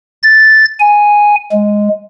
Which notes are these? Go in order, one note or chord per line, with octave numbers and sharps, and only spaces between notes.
A6
G#5
G#3